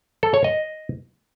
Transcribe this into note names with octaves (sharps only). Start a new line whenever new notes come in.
A4
C#5
D#5